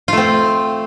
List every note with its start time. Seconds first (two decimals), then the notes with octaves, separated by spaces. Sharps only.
0.08 F4
0.13 A3
0.17 C4